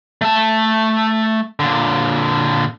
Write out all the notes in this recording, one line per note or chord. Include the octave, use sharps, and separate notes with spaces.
A3 A5
A#2 D3